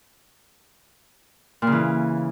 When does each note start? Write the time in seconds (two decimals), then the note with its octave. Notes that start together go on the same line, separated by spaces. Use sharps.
1.62 A#2
1.67 C#3
1.72 E3